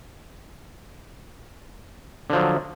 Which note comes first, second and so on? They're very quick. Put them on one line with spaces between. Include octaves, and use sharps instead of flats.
D3 F3 F#3